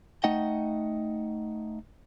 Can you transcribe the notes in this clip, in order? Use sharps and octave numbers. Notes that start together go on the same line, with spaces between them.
A3 D#4 D#5 F#5 G5